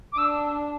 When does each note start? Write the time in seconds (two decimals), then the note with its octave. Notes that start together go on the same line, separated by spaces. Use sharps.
0.12 D6
0.17 D4 E6